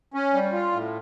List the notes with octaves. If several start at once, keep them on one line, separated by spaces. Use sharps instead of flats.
C#4
G3
F4
A2